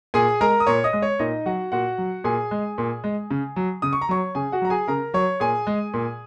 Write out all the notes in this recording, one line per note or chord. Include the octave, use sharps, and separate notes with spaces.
A#2 G#4 G#5
G#3 A#4 A#5
D#6
A#2 C#5 C#6
D#5 D#6
G#3
C#5
A#2 D#4 D#5
F#3 F#4 F#5
A#2 F#4 F#5
F#3
A#2 G#4 G#5
G#3
A#2
G#3
C#3
F#3
C#3 D#6
C#6
A#5
F#3 C#5 C#6
C#3 G#4 G#5
F#4 F#5
F#3 A#5
G#4 G#5
C#3 A#4 A#5
F#3 C#5 C#6
A#2 G#4 G#5
G#3
A#2